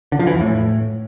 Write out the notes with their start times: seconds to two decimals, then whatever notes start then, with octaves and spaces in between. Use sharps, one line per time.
0.12 D3
0.19 F3
0.27 E3
0.34 F2
0.41 A2